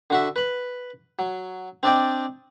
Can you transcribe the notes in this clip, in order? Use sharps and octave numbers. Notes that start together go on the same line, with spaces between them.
D3 F#4 E5
B4 B5
F#3
C4 D4 D5 D#5 G5